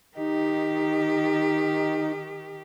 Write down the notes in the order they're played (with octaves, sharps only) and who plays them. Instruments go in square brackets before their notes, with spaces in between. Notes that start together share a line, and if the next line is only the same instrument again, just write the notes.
[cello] D#3 G4 [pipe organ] D#4